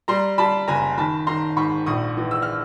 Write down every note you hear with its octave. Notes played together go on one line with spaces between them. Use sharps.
G3 A#5 C6
G3 A5 B5
F#1 G#5 A#5
D#3 A5 B5
D#3 A#5 C6
G#2 B5 C#6
A#1 C#6 D#6
E3
E6
F6